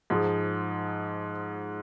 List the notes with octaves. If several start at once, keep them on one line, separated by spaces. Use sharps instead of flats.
G#2 F3 G#3